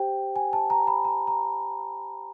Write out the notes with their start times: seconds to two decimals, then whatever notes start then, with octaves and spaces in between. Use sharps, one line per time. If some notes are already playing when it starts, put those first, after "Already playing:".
Already playing: G4 C5 G5
0.36 G#5
0.53 A5
0.70 A#5
0.87 B5
1.05 A#5
1.27 A#5